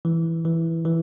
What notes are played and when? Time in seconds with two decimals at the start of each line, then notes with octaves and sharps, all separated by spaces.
0.05 E3
0.45 E3
0.85 E3